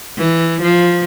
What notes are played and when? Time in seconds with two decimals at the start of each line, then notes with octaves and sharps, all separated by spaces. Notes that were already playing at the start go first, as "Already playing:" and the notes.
0.18 E3
0.62 F3